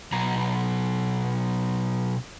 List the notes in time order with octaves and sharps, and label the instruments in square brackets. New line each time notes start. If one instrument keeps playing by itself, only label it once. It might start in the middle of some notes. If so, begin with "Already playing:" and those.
[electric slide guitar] B2 F#3 A#5